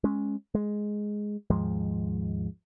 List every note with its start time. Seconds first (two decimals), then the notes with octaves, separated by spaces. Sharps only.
0.04 G#3 C#4
0.55 G#3
1.50 D#2 G#2 F3 G#3